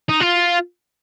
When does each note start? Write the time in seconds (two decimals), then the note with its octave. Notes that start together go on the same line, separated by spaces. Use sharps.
0.09 D#4
0.20 F4